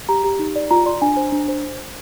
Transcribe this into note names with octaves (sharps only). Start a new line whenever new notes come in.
G4 A#5
G4
D#4
D5
F4 A#5
D5 C6
D4 G#5
C5
D4
C5